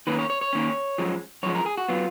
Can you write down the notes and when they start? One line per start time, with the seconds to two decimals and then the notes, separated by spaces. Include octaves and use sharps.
0.07 D#3 A#3 C#4 B4
0.19 C#5
0.30 C#5
0.41 C#5
0.53 D#3 A#3 C#4
0.98 F#2 F3 G#3
1.43 F#2 F3 G#3 C#5
1.55 A#4
1.66 G#4
1.78 F#4
1.88 F#3 B3 F4